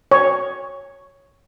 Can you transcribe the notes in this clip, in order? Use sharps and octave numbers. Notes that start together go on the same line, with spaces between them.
C#5